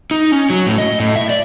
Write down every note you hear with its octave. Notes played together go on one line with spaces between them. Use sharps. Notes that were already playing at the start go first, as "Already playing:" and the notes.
D#4
C#4
F#3
A2
D#5
A2
E5
D5